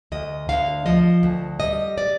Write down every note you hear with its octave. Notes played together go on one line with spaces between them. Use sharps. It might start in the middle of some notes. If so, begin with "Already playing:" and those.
D2 D#5
D2 F5
F3 D#5
D2
G3 D#5
D5